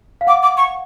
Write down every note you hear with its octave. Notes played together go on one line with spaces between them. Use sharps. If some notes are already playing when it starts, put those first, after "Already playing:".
F5
F#5 D6
D6
C#6